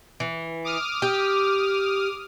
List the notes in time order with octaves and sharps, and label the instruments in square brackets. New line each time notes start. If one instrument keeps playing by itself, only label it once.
[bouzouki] E3
[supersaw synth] D6 D#6 F6
[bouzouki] G4